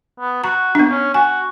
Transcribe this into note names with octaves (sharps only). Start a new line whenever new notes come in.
B3
F#4 A#5
B3 D4
C#4
F#4 G#5